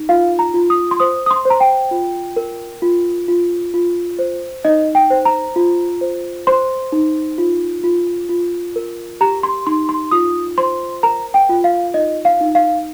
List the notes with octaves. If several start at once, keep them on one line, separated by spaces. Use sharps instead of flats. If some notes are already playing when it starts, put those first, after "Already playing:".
Already playing: D#4
F4 F5
A#5
F4
D#6
C6
C5 D#6
D#6
C6
C5
A#5
G5
F4
A#4
F4
F4
F4
C5
D#4 D#5
G5
C5
A#5
F4
C5
C5 C6
D#4
F4
F4
F4
A#4
G4 A#5
C6
D#4 C6
C6
F4 D#6
C5 C6
A#4 A#5
G5
F4
F5
D#4 D#5
F5
D#4
F5